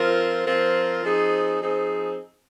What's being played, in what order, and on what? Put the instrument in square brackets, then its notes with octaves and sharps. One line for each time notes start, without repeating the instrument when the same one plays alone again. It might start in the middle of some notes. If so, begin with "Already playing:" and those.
Already playing: [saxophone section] F3 C4 F4 A#4
F3 C4 F4 A#4
F3 C4 D#4 G#4
F3 C4 D#4 G#4